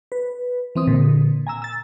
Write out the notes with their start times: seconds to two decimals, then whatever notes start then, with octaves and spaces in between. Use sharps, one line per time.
0.12 B4
0.75 E3 C4 D#6
0.87 A#2 D3
1.47 G#5 A#5 E6
1.62 E6 A6